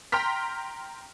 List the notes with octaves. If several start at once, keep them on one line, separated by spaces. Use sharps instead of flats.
G5 A#5 C6 F6 B6